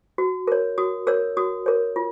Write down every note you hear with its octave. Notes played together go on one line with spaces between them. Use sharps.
F#4
A#4 C#5
F#4 D#6
A#4 C#5 E6
F#4 D#6
A#4 C#5
F4